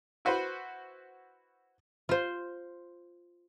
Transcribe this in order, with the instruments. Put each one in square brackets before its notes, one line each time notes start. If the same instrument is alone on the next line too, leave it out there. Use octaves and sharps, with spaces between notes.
[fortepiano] E4 F#4 B4 C5
[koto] F4 C5